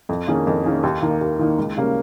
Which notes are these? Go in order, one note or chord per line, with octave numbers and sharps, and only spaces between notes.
F2
D#3 A#3 C#4 G#4
F2
D#3 A#3 C#4 G#4
D#2
D#3 A#3 D#4
D#2
D#3 A#3 D#4
C#2
C#3 G3 A#3 C#4